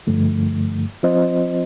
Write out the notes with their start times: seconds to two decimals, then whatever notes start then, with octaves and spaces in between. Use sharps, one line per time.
0.07 G2 D3 F3 A3
1.03 F3 C4 F4 C5 D#5